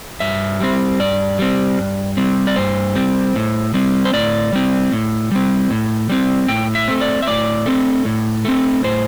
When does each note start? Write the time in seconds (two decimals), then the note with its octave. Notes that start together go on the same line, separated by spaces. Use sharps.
0.20 G2 E5
0.60 G3 C4
1.00 G2 D5
1.39 G3 C4
1.78 G2
2.17 G3 C4
2.47 D5
2.56 G2 C5
2.95 G3 C4
3.35 A2
3.74 G3 C4
4.05 C5
4.13 A2 D5
4.53 G3 C4
4.92 A2
5.31 G3 C4
5.70 A2
6.09 G3 C4
6.48 A2 G5
6.75 E5
6.88 A3 C4
7.01 D5
7.22 E5
7.27 A2 D5
7.66 A3 C4
8.05 A2
8.45 A3 C4
8.84 A2 C5